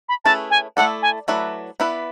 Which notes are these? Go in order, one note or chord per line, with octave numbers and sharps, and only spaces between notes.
B5
A3 C#4 E4 G#4 B4 A5
G#5
A3 E4 A4 D5 F#5
G#5
F#3 A3 E4 B4 D5
B3 E4 B4 D5